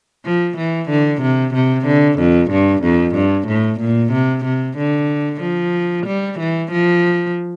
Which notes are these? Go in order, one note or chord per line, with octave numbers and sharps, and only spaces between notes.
F3
E3
D3
C3
C3
D3
F2
G2
F2
G2
A2
A#2
C3
C3
D3
F3
G3
E3
F3